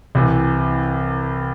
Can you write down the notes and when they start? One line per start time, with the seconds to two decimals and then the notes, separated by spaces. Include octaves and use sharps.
0.15 C2 C3 E3